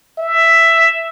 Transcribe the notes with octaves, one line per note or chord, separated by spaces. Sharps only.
E5